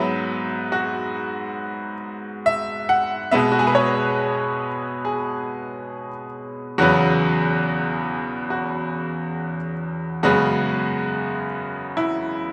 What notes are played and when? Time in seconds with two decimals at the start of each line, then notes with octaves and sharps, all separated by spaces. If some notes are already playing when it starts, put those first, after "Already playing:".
Already playing: G#2 F#3 B3 E5
0.72 F#4
2.46 E5
2.89 F#5
3.31 B2 G#3 B3 E5
3.52 F#4
3.59 G#4
3.67 B4
3.75 C#5
5.05 G#4
6.78 E2 C#3 F#3 B3 F#4
8.50 F#4
10.23 F#2 C#3 G#3 B3 F#4
11.97 E4